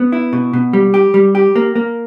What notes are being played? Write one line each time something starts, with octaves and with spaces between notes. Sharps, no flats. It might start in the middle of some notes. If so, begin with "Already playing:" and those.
Already playing: B3
E4
B2
B2
G3
G4
G3
G4
A#3
A#3